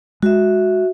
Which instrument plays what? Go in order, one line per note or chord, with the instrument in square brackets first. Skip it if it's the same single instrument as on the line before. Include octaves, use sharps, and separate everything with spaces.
[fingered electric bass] G#3 [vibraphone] F#4 E5